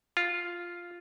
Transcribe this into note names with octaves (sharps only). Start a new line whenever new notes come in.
F4